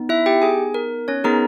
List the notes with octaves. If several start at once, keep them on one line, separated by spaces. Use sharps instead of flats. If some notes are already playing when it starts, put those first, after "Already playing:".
Already playing: B3 D#4
E4 E5
G4 G5
G#4 G#5
A#4
C#4 C#5
B3 D#4 G#4 A#4 A#5